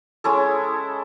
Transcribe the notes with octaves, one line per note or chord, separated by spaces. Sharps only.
G#3 C#4 E4 A4